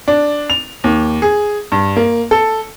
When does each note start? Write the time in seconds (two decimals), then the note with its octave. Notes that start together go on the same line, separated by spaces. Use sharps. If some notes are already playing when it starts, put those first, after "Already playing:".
0.08 D4
0.50 F7
0.84 D#2
1.22 G#4
1.72 G2
1.97 A#3
2.31 A4